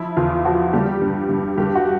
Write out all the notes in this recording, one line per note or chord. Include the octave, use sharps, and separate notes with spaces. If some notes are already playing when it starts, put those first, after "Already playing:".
Already playing: F3 E4
E2 F4
F3 F#4
G3 G4
G2
G2
G2 G4
F#4